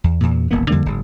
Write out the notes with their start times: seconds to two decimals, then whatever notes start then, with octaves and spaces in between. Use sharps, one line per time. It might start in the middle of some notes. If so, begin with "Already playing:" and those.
0.04 E2
0.21 E2 A#2
0.51 D#1 A1 A#3 B3
0.70 F2 D3 G3 A#3
0.86 F#1 G#2